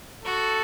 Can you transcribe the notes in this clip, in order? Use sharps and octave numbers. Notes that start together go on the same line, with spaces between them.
F#4 A4